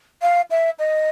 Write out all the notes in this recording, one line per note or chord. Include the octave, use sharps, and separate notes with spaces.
F5
E5
D#5